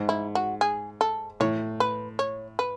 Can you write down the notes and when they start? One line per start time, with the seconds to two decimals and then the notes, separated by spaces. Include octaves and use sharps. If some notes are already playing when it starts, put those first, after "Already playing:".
Already playing: G#2
0.09 E4
0.35 F#4
0.61 G#4
1.01 A4
1.40 A2 C#5
1.80 B4
2.19 C#5
2.59 B4